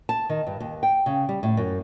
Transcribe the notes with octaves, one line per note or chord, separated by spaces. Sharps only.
A5
D#3
G2
D#2
G5
C#3
G3
A2
F#2